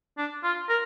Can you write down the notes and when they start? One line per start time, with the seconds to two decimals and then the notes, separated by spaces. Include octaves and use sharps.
0.18 D4
0.43 F4
0.69 A#4